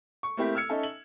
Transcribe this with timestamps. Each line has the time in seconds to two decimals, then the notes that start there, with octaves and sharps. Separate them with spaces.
0.23 C#6
0.37 A3 A#3 C4 E4 G4 A#4
0.55 E6 F6 G#6 C#7
0.69 C#4 D#4 A4 E5
0.83 F#7